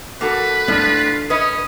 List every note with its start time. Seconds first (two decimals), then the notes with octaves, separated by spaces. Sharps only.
0.21 A#3 F#4 A4 B4
0.68 A2 D4 F4
1.30 C#4 B4 D#5 D#6